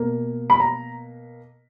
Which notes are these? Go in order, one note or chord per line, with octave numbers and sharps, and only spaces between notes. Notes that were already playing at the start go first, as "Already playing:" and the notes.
Already playing: B2 A#3
B5
A#5